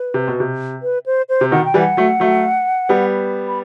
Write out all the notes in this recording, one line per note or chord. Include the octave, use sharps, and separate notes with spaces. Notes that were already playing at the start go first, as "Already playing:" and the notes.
Already playing: B4
C3
B2
C3
B4
C5
C5
C3
B2 D#3 F#5
G5
E3 G3
F#5
F#3 A3
F#3 A3
G3 B3
B5